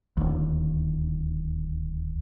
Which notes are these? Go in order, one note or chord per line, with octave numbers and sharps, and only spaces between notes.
D1 D#2